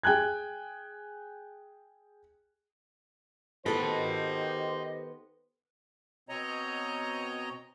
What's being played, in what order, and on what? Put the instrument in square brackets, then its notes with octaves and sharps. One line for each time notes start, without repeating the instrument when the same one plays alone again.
[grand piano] G#4 G5 G#5 F#6 G#6
[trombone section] D#3 G4 C5 [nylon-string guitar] B3 A4 B4 [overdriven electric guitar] D#5 A5
[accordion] B2 C4 C#5 D#5 A#5